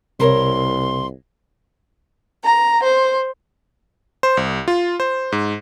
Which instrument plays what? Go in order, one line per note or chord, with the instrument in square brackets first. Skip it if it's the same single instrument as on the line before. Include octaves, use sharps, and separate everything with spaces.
[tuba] C2 [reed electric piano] C3 [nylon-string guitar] E4 A#4 C#5 [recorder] C6
[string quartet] A#5
C5
[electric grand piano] C5
C2
F4
C5
G#2